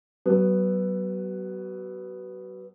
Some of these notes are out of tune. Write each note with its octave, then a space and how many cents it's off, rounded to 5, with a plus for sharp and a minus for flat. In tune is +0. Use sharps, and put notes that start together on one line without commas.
F#3 +35 B3 +0